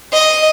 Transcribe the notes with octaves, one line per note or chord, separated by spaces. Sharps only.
D#5